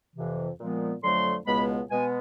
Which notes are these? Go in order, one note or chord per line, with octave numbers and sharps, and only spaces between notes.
F2 C3 E3
A#2 F3 G#3 B3
F2 D3 F#3 A3 C6
C#2 B2 G#3 B3 B5
B2 G#3 B3 G#5